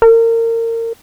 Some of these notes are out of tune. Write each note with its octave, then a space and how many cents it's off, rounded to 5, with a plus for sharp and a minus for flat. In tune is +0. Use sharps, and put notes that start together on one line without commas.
A#4 -30